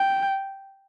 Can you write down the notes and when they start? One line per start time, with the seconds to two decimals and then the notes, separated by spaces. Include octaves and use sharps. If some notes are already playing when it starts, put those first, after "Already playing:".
Already playing: G5